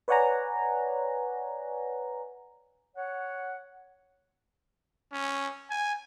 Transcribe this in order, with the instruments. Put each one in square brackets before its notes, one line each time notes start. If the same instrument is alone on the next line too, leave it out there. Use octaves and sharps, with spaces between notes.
[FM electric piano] B4 C#5 D5 F#5 G#5 A#5
[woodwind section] C#5 F#5
[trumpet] C#4
G#5